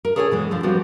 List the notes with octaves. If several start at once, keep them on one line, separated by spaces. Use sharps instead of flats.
A#4
G#4 A4 C#5 D5 E5 G#5
B2 E3 G#3
D3 F3
F3 G3 B3 C4 F#4